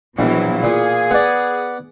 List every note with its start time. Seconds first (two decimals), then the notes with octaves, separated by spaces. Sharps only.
0.19 A#1 B2 E3 F#3
0.63 A#2 G#4
1.11 B3 D5